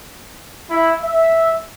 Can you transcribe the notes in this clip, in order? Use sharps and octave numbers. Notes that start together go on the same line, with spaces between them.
E4
E5